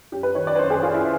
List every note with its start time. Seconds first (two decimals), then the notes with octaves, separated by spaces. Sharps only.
0.12 F#2 G4
0.23 B4
0.35 D#3 C#5
0.47 D5
0.55 B4
0.59 F#2 C5
0.70 G#4
0.82 D#3 F4
0.94 E4